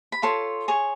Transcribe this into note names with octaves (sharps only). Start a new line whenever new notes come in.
B5
F4 A4 C#5 C6
G#4 C#5